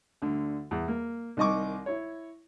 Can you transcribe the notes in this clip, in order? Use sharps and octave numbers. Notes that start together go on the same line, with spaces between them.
D2 D3
E2
A#3
C2 D#3 D#5 C#6 D6
E4 C#5